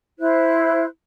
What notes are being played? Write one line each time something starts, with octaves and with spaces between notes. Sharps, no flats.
E4 C5 F#6